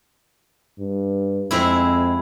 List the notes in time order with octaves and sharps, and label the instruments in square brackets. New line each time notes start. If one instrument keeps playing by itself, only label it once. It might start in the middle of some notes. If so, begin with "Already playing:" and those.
[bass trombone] G2
[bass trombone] F2 [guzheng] G#3 C4 E4